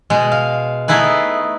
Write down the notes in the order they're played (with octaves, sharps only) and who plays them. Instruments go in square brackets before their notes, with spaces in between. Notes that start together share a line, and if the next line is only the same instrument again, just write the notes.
[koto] B2 G#3
F5
A3 B3 D#4 E4 G#4 B4